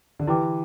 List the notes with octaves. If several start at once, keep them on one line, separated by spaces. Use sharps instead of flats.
D3
E3 E4 G4 B4 G5 D6